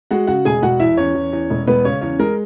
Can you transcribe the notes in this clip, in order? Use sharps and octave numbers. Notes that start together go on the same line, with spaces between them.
G#3 F#4 F#5
C#3 F#4 F#5
E1 G#4 G#5
E1 F#4 F#5
E2 E4 E5
E2 C#4 C#5
E2
E2
E1
E1 B3 B4
C#3 C#4 C#5
E2 C#4 C#5
G#3 A#4